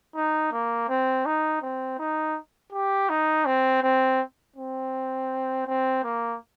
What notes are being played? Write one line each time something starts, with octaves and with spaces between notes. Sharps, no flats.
D#4
A#3
C4
D#4
C4
D#4
G4
D#4
C4
C4
C4
C4
A#3